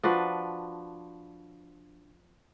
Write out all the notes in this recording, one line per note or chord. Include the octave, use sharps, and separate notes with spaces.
F3 D4 F#4 B4